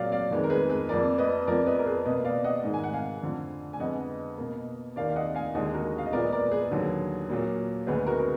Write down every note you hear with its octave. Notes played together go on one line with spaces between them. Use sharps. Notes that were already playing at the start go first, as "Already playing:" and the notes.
Already playing: A#2 F#3 A#3 D5 F5
D5 F5
F2 D#3 G#3 B3
A#4
G#4 B4
G#4 B4
F2 F3 A#3 A#4 D5
B4 D#5
F2 F3 B3 A#4 D5
B4 D#5
A#4
G#4 B4
B2 A#3 B4 D#5
D5 F5
D#5 F#5
G#2 D#3 G#3
G#5
F#5
F5 G#5
F2 D3 F3
G#5
F2 D3 G#3 B3 D#5 F#5
B2 A#3
D#2 D#3 A#3 D5 F5
F5
D#5 F#5
F5 G#5
D#2 D3 G#3 D#5 F#5
G#4
F#4 A#4
F5
D#5
A#2 F3 G#3 B3 A#4 D5
D#5
A#4 D5
G#4 B4
D#2 D3 F#3
A#2 F#3 A#3
D2 D3 G#3 B3 G#4 B4
F#4 A#4
A#4